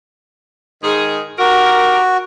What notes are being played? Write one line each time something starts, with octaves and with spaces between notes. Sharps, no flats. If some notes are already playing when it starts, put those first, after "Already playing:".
G#2 D#3 G#4
D#4 F#4 G4 A#4